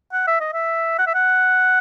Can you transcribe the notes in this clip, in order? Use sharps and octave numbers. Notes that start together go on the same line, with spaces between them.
F#5
E5
D#5
E5
F#5
E5
F#5